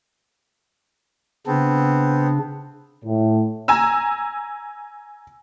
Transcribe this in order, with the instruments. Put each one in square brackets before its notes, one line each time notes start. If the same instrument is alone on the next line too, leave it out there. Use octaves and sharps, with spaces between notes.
[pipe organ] C#3 D4 [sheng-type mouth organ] B3 C4
[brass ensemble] A2
[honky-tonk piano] G#5 A#5 E6